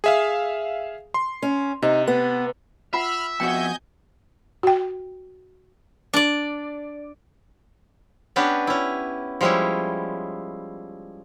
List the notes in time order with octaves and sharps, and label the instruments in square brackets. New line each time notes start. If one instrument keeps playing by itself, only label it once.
[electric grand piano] G#4 E5 F5
C6
[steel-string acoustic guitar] C#4
[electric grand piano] C3 [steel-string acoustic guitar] D#4
[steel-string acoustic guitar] B3
[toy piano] F4 F#5 [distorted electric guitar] E5 [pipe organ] B5 F6
[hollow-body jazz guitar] F2 B3 F#4 [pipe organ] D#5 G#5 G6 [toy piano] G5
[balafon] F#4 G5
[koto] D4 D5
B3 C#4 D4 G4 B4
C#4 E4
F3 G3 G#3 C#4 E4